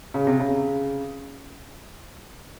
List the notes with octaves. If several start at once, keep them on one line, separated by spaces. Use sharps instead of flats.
C#3
C3
C#3